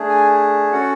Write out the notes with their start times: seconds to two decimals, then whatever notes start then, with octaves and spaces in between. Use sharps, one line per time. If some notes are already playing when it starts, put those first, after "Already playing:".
Already playing: A3 D4 G#4
0.09 G#5
0.72 C#4 F#4 A4 F#5